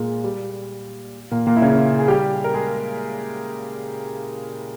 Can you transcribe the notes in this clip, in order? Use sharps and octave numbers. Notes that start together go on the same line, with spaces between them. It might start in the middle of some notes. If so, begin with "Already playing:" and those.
Already playing: A#2 G#3 A#3
G3
A#2 A#3
A#2 A#3
E4
C#3 C#4
G#4
G3 G4
A#4
G#3 G#4